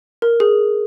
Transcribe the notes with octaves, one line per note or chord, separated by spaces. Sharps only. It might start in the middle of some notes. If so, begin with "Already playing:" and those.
A#4
G#4